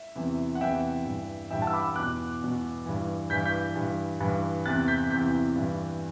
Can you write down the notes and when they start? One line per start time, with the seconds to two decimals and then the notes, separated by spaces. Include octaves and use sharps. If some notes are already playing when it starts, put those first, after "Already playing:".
Already playing: E5
0.15 E2 C3 E3
0.55 F#5
0.61 E2 C3 E3 E5 G5
1.05 G2 E3
1.50 G2 E3 E5 G5
1.62 F#5 A5
1.67 E6
1.73 B5 D6
1.95 E2 B2 D6 F#6
2.41 E2 B2
2.86 G2 E3
3.30 G2 E3 G6 B6
3.46 G6 B6
3.76 G2 E3
4.20 G2 E3
4.65 E2 C3 E3 F#6 A6
4.88 G6 B6
5.10 E2 C3 E3 G6 B6
5.56 G2 E3